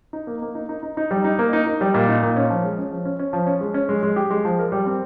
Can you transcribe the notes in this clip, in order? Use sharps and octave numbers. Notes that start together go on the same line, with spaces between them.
D#4
A#3
A#3
D#4
D#4
D#4
D#4
G3
D#4
A#3
D#4
D#4
G3
A#2
D#4
A#2
C#4
F3
G#3
C#4
F3
C#4
C#4
F3
C#4
G#3
C#4
G#3
G#3
G4
G#3
F3
A#4
G3
C4